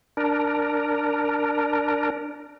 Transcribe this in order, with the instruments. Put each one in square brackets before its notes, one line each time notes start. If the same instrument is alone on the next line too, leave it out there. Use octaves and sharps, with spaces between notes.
[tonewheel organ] D4 A#4